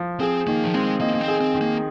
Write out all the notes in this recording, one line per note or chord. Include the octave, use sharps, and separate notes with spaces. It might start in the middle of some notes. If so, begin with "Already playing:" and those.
Already playing: F3
C4 G#4
D#3 A#3
F3
G#3 C4
A#3 D#4
A#3
C4
G#4
C4
D#3
A#3